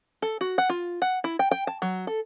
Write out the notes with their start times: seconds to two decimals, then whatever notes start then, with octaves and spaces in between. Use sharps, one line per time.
0.22 A4
0.41 F#4
0.58 F#5
0.70 F4
1.02 F#5
1.24 E4
1.39 G5
1.51 G5
1.67 A5
1.82 F#3
2.07 A4